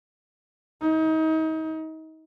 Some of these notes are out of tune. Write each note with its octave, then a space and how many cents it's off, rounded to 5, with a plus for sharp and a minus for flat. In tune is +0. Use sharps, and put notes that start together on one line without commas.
D#4 +35